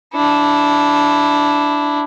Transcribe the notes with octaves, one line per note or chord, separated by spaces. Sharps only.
D4 E4